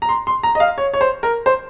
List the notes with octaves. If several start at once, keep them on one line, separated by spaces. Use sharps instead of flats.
A#5
C6
C6
A#5
D#5
F5
C#5
C#5
C5
A#4
C5